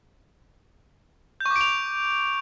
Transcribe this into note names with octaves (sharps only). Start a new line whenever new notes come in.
G6
C#6
D6
D7
F7